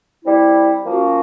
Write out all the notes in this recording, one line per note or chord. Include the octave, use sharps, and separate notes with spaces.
G3 C4 E4
F3 A#3 C#4 F#4